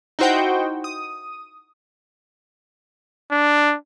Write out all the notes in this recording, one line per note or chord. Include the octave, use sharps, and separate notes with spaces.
D#4 E4 F#4 C5 F#5 G5
D#6
D4